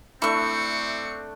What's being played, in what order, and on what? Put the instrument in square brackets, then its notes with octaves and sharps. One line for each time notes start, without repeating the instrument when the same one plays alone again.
[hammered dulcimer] A3 D4 [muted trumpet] C4 [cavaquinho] E4 C#6 [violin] C#7